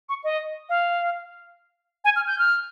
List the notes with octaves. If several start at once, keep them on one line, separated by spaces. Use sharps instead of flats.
C#6
D#5
F5
G#5
F6
G6
F6